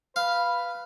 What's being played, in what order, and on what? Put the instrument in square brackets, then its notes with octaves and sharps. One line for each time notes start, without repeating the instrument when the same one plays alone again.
[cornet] B4 [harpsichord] F5